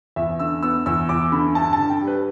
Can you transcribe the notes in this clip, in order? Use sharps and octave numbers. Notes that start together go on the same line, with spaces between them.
E2 E5
D3 E6
B3 E6
E2 E6
E2 D6
D3 B5
G2 A5
A5
D3
G5
G3
B4